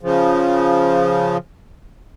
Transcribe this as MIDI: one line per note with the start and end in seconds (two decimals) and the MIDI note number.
0.01 1.37 49
0.01 1.37 53